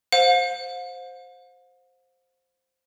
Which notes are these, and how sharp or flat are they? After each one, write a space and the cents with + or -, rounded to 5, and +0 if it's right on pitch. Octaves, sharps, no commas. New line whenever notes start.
C5 +0 F5 +45